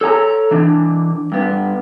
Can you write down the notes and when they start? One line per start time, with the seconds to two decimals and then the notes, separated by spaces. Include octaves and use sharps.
0.01 A4 C#5 G#5 A#5
0.51 E3 D4
1.32 G2 B3